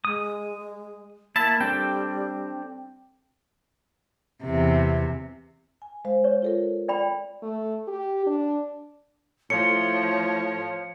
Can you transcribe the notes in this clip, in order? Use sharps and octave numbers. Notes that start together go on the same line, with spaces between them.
G#3 D#6
A#3 E4 E5 A5 B5
G3 C4 D4 A4 G5
E2 C3
G#5
G#3 C5 F5
C#5
F4 A4 A#4
D5 G5 B5
A3
G4
D4
A2 F3 C#5 C#7